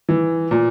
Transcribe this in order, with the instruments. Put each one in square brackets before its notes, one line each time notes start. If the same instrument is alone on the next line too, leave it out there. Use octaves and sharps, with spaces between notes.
[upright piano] E3
A#2